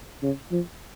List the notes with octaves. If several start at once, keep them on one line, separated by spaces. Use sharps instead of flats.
C#3
F3